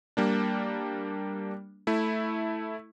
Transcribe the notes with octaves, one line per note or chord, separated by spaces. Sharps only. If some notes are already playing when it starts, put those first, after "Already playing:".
G3 A#3 D4
A3 E4